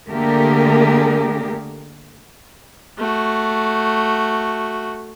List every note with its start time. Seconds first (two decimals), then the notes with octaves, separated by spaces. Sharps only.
0.11 D3 A3 A#3 G4 G#4 A#4
2.98 A3 F#4